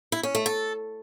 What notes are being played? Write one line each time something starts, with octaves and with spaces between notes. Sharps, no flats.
E4
C#4
A3
A4